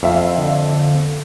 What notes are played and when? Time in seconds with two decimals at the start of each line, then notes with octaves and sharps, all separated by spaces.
0.03 F2 E5 F5
0.38 D3